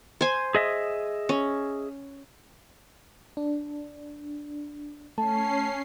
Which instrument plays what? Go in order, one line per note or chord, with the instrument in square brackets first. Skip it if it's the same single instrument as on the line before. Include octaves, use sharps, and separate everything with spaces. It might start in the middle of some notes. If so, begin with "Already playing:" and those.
[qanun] C5 G#5
[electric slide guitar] G#4 D#5 E5
[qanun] C#4
[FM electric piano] D4
[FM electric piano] A3 [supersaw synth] C#4 C7 [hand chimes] A5